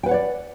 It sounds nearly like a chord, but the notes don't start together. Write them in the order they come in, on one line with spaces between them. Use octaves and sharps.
G5 B4 F#5 C#5 D5